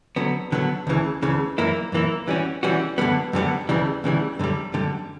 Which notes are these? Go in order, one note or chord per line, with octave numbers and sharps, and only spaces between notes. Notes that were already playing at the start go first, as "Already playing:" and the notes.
D3 F#3 B3
D3 F#3 B3
D2 C#3 E3
D2 C#3 E3
F#2 E3 A#3 E4
F#2 E3 A#3 E4
E3 G3 C#4 F#4
E3 G3 C#4 F#4
F#2 D3 G3 B3
F#2 D3 G3 B3
D2 C#3 E3 G3
D2 C#3 E3 G3
F#2 D3 G3
F#2 D3 G3